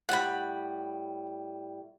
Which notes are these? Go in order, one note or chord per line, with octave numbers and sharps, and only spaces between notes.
A2 G3 F#5 B5